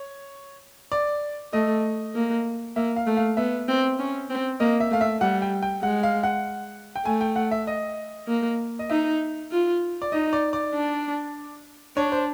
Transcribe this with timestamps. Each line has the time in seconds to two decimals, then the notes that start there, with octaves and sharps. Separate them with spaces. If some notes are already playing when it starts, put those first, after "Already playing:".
Already playing: C#5
0.92 D5
1.53 A3 D#5
2.15 A#3
2.76 A#3 E5
2.96 F5
3.07 A3
3.17 F5
3.37 B3 E5
3.68 C4
3.99 C#4
4.29 C4
4.60 A#3 D#5
4.80 E5
4.91 A3 F5
5.01 E5
5.21 G3 F#5
5.42 G5
5.62 G5
5.83 G#3 F#5
6.03 F5
6.23 F#5
6.96 G5
7.05 A3 G#5
7.21 G5
7.36 F#5
7.51 E5
7.67 D#5
8.28 A#3
8.79 D#5
8.90 D#4 E5
9.51 F4
10.02 D5
10.12 D#4 D#5
10.33 D5
10.53 D5
10.74 D4
11.97 D4 C#5
12.12 C5